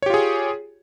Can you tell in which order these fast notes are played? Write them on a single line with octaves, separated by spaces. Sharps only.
C#5 G4 F4 G#4